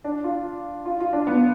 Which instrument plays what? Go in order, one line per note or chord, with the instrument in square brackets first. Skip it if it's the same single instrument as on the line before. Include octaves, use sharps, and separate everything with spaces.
[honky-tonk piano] D4
F4
F4
F4
D4
B3